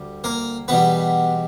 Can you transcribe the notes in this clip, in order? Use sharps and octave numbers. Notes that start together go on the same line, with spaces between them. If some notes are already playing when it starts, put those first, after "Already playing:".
Already playing: D2 G3
A#3 A#4
E2 B2 G3 B3 B4